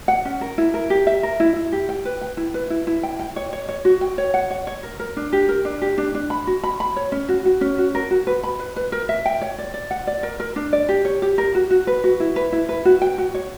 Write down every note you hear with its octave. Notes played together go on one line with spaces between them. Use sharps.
F#5
C#4
A#4
E4
A#4
G4
E5
A#4
E4
E4
G4
G5
B4
G5
E4
B4
E4
E4
G5
G5
C#5
C#5
C#5
F#4
G5
C#5
F#5
C#5
C#5
A#4
A#4
D4
G4
A#4
D4
G4
D4
D4
B5
F#4
B5
B5
C#5
C#4
F#4
F#4
C#4
F#4
A#4
F#4
B4
B5
B4
B4
A#4
E5
G5
C#5
D5
D5
F#5
D5
A#4
A#4
D4
D5
G4
C#5
G4
A#4
F#4
F#4
B4
F#4
E4
B4
E4
B4
F#4
G5
F#4
C#5